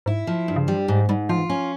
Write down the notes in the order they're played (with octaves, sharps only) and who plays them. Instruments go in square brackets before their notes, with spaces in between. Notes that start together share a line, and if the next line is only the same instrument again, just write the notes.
[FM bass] G#2 [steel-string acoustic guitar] E4
[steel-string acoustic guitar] F3
G2
[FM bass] C#3
[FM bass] E3 [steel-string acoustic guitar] G3
[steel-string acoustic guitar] G#2
[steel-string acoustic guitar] G#2 [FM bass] G3
[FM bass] F3 [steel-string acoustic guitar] F4
[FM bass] E3
[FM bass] F3 [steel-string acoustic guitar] C#4